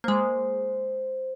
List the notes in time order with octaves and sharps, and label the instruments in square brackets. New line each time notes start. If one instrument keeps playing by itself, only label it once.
[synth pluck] G#3 A#3 [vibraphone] C5